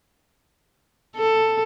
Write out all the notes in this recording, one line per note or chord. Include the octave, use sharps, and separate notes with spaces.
A4